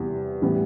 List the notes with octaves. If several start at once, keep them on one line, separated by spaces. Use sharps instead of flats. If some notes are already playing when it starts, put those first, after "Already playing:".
Already playing: E2 C3 G3
A2 E3 G3 B3